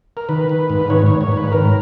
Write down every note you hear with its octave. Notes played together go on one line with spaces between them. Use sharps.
A#4
D#3 B4
D#3
G#2
D#3 C#5
G#2 C#5
C#5
G#2
B4
D#3 A#4